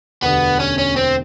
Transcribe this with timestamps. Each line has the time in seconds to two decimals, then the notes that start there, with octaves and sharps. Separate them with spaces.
0.22 E1 D2 D3 G3 B3
0.60 C#4
0.79 C#4
0.97 C4